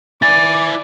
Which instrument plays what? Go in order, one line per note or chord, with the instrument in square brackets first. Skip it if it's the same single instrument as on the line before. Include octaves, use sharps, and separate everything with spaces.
[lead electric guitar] E4 G#5 [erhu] D5 [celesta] A6